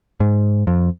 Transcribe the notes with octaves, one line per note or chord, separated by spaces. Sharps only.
G#2
F2